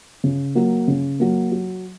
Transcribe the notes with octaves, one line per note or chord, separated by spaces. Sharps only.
C#3
F#3 A#3
C#3
F#3 A#3
F#3